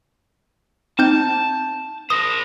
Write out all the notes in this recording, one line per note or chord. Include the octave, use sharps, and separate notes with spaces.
C4 D#4 A5 G6
A#4 C5 D#6